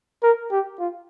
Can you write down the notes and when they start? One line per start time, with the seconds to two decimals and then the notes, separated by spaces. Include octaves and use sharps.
0.23 A#4
0.51 G4
0.79 F4